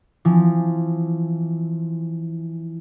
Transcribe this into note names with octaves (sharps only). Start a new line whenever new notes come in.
E3 F3 C4